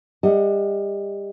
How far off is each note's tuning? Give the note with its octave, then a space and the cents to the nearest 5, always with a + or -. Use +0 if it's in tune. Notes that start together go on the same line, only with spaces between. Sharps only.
G3 +30 D#5 +25 F#5 +0